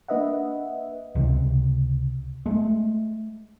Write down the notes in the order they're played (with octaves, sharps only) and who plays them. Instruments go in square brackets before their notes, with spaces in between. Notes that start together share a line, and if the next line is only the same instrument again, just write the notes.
[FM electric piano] A#3 D4 B4 D#5 E5 F#5
[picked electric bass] C#2 C3
G#3 A3